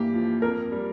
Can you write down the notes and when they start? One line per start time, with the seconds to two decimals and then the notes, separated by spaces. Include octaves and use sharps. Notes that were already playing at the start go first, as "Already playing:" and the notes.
Already playing: G2 E3 A#3 G4
0.14 F3
0.42 F2 A#4
0.72 G3